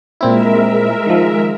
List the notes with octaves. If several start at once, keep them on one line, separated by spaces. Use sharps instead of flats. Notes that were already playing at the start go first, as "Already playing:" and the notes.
A#2 G#3 C4 E4 A#4 E5
D#3 F3